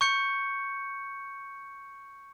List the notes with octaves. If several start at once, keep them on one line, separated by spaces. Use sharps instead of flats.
C#6 G6 C#7